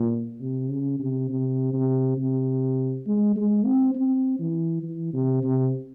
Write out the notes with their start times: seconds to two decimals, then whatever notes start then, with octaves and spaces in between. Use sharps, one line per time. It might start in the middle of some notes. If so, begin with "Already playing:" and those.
Already playing: A#2
0.41 C3
0.69 C#3
0.99 C3
1.29 C3
1.73 C3
2.17 C3
3.07 G#3
3.36 G#3
3.65 C4
3.95 C4
4.39 E3
4.83 E3
5.13 C3
5.43 C3